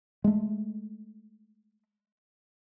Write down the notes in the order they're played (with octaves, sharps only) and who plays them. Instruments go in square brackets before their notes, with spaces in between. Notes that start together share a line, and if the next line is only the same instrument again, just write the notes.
[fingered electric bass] G#3 A3